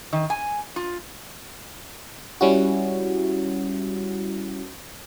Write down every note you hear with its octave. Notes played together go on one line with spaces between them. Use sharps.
D#3
G#5
F4
G3 C#4 E4 F#4